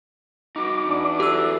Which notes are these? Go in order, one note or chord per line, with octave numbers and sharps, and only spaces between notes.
D#4 F#4 D6
E2 D4
E4 F#4 G4 A4 E6